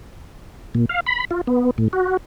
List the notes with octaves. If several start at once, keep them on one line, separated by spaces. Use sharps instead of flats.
A#2
F5
B5
F4
B3
A2
F#4